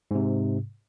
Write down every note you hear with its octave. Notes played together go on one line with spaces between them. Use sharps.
G#2 C3